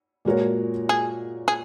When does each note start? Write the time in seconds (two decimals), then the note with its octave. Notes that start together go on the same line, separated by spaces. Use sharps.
0.25 A#2 G#3 F#4 A#4 C#5
0.89 G#4
1.48 G#4